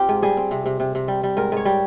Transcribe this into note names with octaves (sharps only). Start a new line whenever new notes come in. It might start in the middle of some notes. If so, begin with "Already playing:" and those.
Already playing: C4 F4 G4
G#2
G3 G#4
C4
C3
C3
C3
C3
G3
G3
G#2 A#4
G#2 C#5
G3